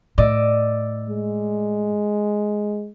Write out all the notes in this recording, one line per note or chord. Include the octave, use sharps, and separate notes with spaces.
A2 D5 D#5 E6
G#3